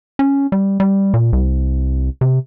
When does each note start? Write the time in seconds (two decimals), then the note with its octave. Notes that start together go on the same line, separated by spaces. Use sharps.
0.19 C#4
0.52 G3
0.80 G3
1.14 A#2
1.33 C2
2.21 C3